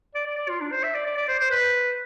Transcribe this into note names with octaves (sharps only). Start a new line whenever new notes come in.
D5
D5
D5
F4
D4
C5
E5
D5
D5
D5
C5
C5
B4